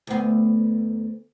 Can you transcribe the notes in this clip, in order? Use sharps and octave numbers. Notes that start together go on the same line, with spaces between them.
D2 B3